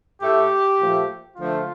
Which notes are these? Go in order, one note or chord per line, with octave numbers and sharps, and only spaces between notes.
A2 A3 G4
A#2 F3 A3
D3 F3 A3 F4